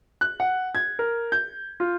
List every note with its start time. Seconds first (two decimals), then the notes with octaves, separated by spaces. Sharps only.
0.21 F#6
0.40 F#5
0.75 G#6
0.99 A#4
1.32 G6
1.80 F4